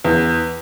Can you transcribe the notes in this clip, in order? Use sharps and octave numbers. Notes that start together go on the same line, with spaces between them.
E2